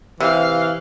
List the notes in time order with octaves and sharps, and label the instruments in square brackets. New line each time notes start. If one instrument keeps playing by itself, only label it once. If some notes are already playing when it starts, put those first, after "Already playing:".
[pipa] C3 [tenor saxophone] E3 [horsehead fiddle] F5